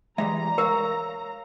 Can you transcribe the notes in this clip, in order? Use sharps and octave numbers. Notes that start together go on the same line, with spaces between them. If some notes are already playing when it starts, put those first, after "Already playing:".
E3 G3 G#3 E5 A#5
A#4 C#5 F5